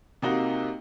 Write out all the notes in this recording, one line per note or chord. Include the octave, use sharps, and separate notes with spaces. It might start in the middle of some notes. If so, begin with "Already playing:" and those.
C3 A#3 D#4 F#4